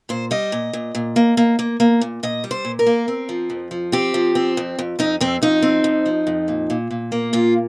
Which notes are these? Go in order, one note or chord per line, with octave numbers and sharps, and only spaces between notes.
A#2 C5
G3 D#5
A#2
A#2
A#2
A#3
A#3
A#3
A#3
A#2
A#2 D#5
G3
C5
A#2
A#4
A#3
C4
F3
F2
F3
C4 G4
F3
C4
F2
F2
F2 D#4
F2 C4
F2 D#4
C4
F2
F3
F2
A#2
A#2
A#2
A#3
A#2 F4